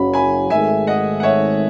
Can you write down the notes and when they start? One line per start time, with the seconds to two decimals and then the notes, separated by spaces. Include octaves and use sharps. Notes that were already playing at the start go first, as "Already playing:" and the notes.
Already playing: F#1 F#2 C#3 F#3 B5
0.14 G#5 B5
0.50 G#1 G#2 D#3 A3 E5 G#5
0.87 D#5 F#5
1.20 F#5
1.23 C#5 E5